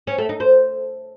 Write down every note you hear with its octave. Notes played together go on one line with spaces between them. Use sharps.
C#4
A3
D#4
C5